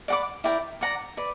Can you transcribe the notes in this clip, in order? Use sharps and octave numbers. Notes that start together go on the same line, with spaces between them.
D5 F#5 B5 D6
E4 A#4 D5 G5
D5 F#5 A#5
B4 D5